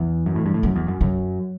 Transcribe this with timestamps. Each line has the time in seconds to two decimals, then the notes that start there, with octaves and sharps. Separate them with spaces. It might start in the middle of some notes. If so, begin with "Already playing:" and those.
Already playing: E2 E3
0.26 F#2
0.35 A2
0.46 G2
0.54 A2
0.63 F#2 F#3
0.76 E2
0.88 F#2
1.01 F#2 F#3